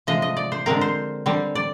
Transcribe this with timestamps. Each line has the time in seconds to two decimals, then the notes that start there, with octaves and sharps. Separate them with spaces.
0.07 C3 F3 G#3 D#5
0.22 D#5
0.37 D5
0.52 C5
0.66 D3 G#3 C4 A#4
0.81 C5
1.26 D3 G3 C4
1.55 D5